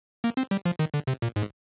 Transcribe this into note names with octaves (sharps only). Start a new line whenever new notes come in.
A#3
C4
G3
F3
D#3
D3
C3
A#2
G#2